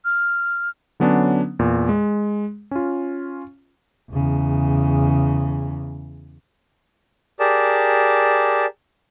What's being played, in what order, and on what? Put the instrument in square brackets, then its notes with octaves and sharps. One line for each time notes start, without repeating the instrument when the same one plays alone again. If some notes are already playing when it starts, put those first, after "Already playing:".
[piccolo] F6
[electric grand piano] D3 F#3 B3 C#4 D4
E2 A#2
G#3
C#4 F4
[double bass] E2 C#3
[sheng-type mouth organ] G4 G#4 A#4 D5 A5